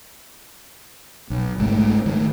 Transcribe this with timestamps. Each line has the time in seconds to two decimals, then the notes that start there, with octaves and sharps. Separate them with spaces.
1.30 B1
1.58 G1 G#2 C#3 A3
2.06 D#3 A3